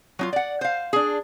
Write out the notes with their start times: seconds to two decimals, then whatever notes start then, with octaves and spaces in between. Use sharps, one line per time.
0.19 F#3 D#4 F4
0.33 D5 F#5
0.61 C5 F5
0.93 D4 G#4